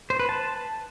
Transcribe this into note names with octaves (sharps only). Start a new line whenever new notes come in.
C5
B4
A5